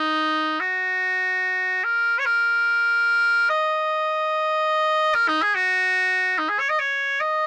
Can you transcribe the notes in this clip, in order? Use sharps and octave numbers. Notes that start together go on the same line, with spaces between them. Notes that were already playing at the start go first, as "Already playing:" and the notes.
Already playing: D#4
F#4
A#4
C#5
A#4
D#5
A#4
D#4
G#4
F#4
D#4
G#4
C#5
D#5
C#5
D#5